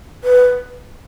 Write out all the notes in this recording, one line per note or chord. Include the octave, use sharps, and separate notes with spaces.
B4